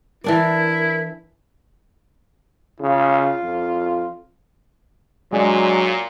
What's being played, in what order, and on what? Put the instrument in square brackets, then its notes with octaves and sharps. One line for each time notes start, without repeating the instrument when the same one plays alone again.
[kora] E3 D4 D5 [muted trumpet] E4 [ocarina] A#4
[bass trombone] C#3 [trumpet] F4
[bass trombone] F2
[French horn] A#2 [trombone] F#3 [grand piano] G#3 D4